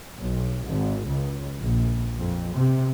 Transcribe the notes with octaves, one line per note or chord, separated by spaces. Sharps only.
B1
G#1
C#2
A#1
F2
C3